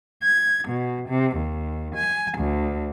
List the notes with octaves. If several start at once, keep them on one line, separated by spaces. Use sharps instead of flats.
G#6
B2
C3
D#2
G#5
D2